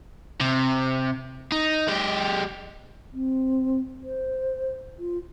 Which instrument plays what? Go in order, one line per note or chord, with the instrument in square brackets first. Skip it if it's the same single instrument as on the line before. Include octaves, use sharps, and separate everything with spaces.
[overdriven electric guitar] C3
D#4
G#3 G4
[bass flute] C4
C5
F4